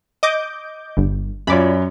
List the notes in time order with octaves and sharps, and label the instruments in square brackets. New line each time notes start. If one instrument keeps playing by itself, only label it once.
[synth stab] D#5 D6 G6
G1
[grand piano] F#2 C#5 [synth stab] F4 D5 B5